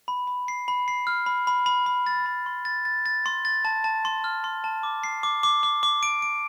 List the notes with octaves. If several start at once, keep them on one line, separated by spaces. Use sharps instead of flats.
B5
B5
C7
B5
C7
F6
B5
B5
B5
B5
A6
B5
C6
A6
A6
A6
C6
A6
A5
A5
C6
F6
C6
A5
D6
C7
D6
D6
D6
D6
D7
D7